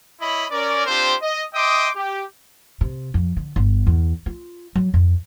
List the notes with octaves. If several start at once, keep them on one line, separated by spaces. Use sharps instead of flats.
E4 C#5 D#5 B5
C#4 A#4 D5
C4 D4 F4 G4 C5
D#5
D#5 E5 G5 C6 D6 D#6
G4
C3
F2
D3
G1
E2
F4
F#3
F2